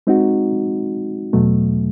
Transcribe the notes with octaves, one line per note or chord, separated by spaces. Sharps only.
G#3 C4 D#4 F#4
E2 B2 F#3 A3